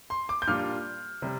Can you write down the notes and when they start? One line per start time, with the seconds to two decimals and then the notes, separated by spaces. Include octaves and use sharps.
0.10 C6
0.29 D6
0.42 G6
0.47 A#2 G3 D4 F4 F6
1.22 C3 G3